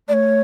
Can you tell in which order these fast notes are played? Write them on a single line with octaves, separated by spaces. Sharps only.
A3 D5 C#5